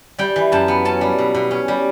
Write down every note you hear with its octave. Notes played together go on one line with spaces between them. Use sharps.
G3 G5
E3
F#2 A5
B3
C#4 A5
G3
B2
B2
C#4
G3